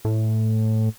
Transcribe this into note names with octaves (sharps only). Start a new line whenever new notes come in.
A2